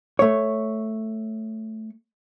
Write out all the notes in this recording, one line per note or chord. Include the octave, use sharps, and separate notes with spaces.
A3 C#5